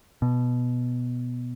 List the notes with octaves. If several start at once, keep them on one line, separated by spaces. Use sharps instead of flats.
B2